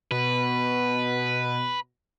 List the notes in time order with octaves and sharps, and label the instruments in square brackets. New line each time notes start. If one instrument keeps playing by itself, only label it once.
[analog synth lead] B2 [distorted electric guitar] B4